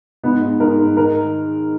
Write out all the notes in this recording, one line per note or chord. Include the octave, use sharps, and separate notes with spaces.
G#2 B3
G#2
G#2 A#4
G#2
D#3 A#4